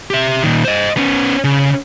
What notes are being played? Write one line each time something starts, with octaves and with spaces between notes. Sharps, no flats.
G4 E5
A#2 D#3
C5 D#5
B3 C#4
C#3